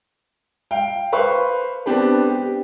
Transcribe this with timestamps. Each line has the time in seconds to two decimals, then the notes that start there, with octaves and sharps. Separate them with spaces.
0.71 F5 G5
1.13 B4 C5 F5 C#6
1.86 B3 C4 D4 G4 B4
2.29 G4